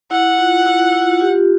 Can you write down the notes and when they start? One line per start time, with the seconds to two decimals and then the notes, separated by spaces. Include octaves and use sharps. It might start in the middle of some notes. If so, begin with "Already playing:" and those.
0.11 E4 F#5
0.39 F4
0.66 E4 F#4
0.93 E4
1.02 F4
1.11 F#4
1.20 F4 G4